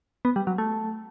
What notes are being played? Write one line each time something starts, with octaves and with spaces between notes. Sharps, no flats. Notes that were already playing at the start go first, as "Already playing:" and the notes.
B3
G3
F#3
A3